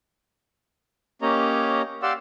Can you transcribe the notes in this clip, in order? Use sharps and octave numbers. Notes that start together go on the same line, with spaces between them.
A#3 C#4 G4 C#5 D#5 A#5
G4 D5 F5 F#5 C6 E6